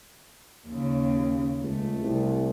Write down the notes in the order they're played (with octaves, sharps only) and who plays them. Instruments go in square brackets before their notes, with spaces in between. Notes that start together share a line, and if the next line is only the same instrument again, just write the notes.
[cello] D#2 C#3
[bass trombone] C#2 [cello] A3
[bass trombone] C2